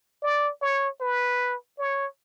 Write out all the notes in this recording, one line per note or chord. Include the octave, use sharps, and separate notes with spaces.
D5
C#5
B4
C#5